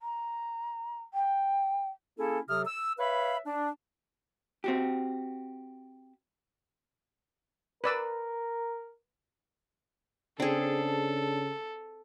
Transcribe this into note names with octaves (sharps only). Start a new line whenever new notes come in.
A#5
G5
A#3 C#4 E4 G#4 A4
C3 F#3 A4 D#6 F6
E6
B4 C#5 E5 F5 B5
D4
C4 F#4 G4
A#4 B4 D5 E6
C#3 C4 D4 G#4 A4